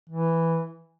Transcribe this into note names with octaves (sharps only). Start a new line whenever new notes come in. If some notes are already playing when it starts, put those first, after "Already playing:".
E3